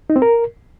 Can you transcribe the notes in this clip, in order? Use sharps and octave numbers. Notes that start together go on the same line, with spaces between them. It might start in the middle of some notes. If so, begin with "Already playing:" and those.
D#4
C4
A#4